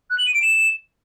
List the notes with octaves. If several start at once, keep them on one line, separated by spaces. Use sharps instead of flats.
F#6
F#7
D#7
D7
E7